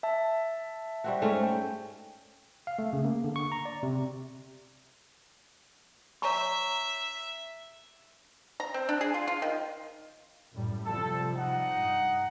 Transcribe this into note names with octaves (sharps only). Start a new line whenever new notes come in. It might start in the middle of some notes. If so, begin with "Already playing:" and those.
E5 A5
G3 C4 F#4
G#2 A3 C#4
G5
F5
A3
C#3
A#3
D3
C#6
A#5
D5
C3
C#5 E5 A#5 C#6
A#5
C4
D4
G#4
F4
F4
D#3
F#2 A2 G3
C3 F3 G3 A4
D#4 F#5
G2